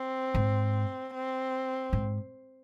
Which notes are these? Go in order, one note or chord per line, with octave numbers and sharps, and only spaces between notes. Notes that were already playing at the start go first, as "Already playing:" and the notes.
Already playing: C4
G#2
C4
G#2